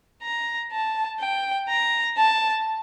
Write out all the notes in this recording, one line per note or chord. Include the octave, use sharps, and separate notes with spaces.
A#5
A5
G5
A#5
A5